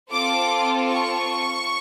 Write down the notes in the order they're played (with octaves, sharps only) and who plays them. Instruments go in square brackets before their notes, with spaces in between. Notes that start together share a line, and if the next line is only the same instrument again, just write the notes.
[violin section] C4 F4 A4 D6
C#6